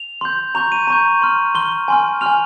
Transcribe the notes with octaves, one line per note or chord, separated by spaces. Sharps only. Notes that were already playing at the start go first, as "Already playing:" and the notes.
Already playing: F7
C6 G6
A#5 C#6 G6 F7
D#7
A#5 C#6 G6
C6 F6
C6 F6 G7
G#5 C6 F6
G#5 C6 F6 F7